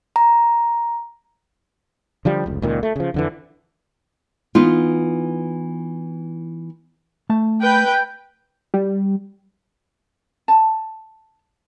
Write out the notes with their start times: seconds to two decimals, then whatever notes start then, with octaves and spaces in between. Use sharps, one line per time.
0.16 A#5
2.25 D3 F3 G3
2.46 F1 C#2
2.62 C#2 A#2 D#3
2.83 A3
2.96 C#3 F3
3.14 F2 D3 E3
4.55 E3 B3 D#4 F4
7.30 A3 A5
7.63 B4 G5
8.74 G3
10.48 A5